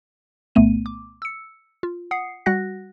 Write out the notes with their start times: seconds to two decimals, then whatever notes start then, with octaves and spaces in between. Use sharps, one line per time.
0.55 C2 A#2 A3 B3 D#7
0.86 D6
1.22 E6 C#7
1.83 F4
2.11 F#5 D#6 C7 C#7
2.46 G3 F#4 F#5 F#6 A#6